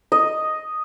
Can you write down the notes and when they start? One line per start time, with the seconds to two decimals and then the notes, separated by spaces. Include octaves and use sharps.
0.12 D#5